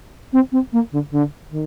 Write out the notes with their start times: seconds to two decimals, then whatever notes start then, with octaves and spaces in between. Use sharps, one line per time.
0.32 C4
0.52 C4
0.72 A#3
0.91 D3
1.10 D3
1.50 D#3